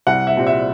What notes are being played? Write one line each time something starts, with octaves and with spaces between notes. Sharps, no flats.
C2 F#5
E5
A#2 G3 C4
E5